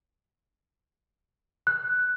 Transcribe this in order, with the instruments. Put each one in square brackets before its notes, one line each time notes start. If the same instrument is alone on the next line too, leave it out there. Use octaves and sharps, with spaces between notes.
[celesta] F#6